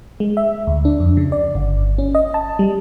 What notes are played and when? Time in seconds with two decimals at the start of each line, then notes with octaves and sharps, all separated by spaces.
0.20 G#3
0.37 E5
0.67 D2
0.85 D4
1.00 F2
1.17 C#3
1.32 D5
1.55 G1
1.98 C#4
2.15 D#5
2.34 A5
2.59 G3